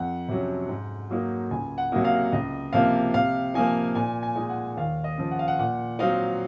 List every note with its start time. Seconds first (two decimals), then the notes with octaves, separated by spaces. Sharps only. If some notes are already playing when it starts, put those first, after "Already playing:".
Already playing: F2 F#5
0.28 C3 F#3 C#4
0.69 G#2
1.10 F#3 A#3 D#4
1.51 C#2 G#5
1.78 F#5
1.92 C3 F#3 A#3 D#4
2.05 F5
2.33 C#2 D#5
2.73 C3 F3 A#3 F5
3.14 C3 F5
3.54 F3 A#3 D#4 G#5
3.95 A#2 G#5
4.23 G#5
4.36 G#3 D#4
4.49 F#5
4.77 D#2 F5
5.04 D#5
5.18 C#3 F3
5.31 F#5
5.39 F5
5.48 F#5
5.59 A#2 F#5
5.99 F#3 C4 D#4 F5